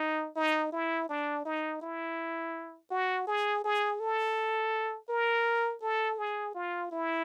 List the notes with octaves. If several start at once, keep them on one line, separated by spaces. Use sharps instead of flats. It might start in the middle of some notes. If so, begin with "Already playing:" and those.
Already playing: D#4
D#4
E4
D4
D#4
E4
F#4
G#4
G#4
A4
A#4
A4
G#4
F4
E4